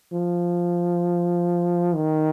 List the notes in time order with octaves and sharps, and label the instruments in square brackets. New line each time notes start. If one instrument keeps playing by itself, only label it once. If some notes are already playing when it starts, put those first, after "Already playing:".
[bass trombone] F3
D#3